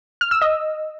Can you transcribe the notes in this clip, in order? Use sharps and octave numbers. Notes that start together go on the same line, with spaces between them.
F6
E6
D#5